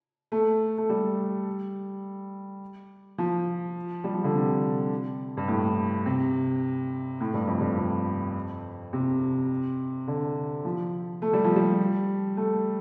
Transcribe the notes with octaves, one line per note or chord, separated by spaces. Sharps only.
A3
A3
G3
F3
G3
F3
D3
C3
G2
A2
C3
A2
G2
F2
G2
F2
C3
D3
F3
A3
G3
F3
G3
A3